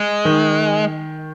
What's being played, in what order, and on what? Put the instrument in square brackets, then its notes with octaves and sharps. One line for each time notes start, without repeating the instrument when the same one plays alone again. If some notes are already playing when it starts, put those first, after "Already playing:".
Already playing: [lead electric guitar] G#3
[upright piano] D#3